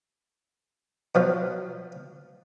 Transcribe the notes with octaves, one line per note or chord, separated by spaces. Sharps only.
B2 F3 F#3